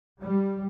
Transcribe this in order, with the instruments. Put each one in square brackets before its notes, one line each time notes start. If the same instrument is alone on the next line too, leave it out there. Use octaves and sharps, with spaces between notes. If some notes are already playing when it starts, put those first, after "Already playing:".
[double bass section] G3